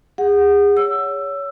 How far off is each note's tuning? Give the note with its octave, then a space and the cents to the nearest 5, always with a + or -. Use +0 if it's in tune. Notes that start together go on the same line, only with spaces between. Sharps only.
G#4 -35 F#5 -5
C#5 +20 E6 +15